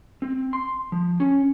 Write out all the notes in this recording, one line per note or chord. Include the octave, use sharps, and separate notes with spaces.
C4
C6
F3
C#4